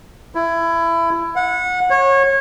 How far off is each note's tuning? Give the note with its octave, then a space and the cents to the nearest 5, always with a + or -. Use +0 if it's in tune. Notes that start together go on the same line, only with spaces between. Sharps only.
E4 +20
F#5 -25
C#5 -25